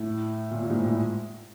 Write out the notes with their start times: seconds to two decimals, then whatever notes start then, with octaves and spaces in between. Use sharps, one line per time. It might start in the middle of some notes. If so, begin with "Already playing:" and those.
Already playing: A2
0.51 A#2
0.62 A#2
0.70 G#2
0.73 A2
0.85 A2